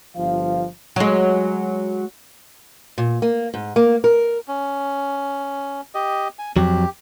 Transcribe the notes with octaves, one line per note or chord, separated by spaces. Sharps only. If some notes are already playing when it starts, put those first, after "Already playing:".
G1 F3 F5
F#3 G#3
A#2
A#3
G#2
A#3
A#4
C#4
G4 D#5
G#5
F2 F#3 G4